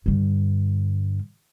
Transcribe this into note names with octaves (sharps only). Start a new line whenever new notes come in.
G2 D3